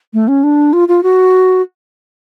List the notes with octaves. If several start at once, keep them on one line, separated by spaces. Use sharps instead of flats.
A3
C#4
D4
F4
F4
F#4